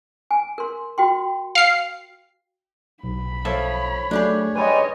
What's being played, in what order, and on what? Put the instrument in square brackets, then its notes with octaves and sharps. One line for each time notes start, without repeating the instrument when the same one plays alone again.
[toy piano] G#5
A#4 C6
F#4 G5 C6
[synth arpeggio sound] F5 C7
[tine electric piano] B1 [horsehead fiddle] B5
[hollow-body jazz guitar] F3 A4 E5 [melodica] C#5
[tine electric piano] F#3 A3 [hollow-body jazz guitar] D4 G4 G#4
[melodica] G3 G#3 G#5 [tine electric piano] B4 [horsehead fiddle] C#5 D#5